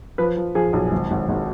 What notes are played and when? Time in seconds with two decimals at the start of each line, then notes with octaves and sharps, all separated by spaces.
0.18 F3 B4
0.37 F3
0.55 F3 G#4
0.73 B1
0.92 G#1
1.11 G#1
1.29 G#1